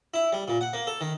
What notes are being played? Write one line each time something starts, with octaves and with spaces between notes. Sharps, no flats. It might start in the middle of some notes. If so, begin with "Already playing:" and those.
E4
G3
A#2
F#5
A#3
A4
D#3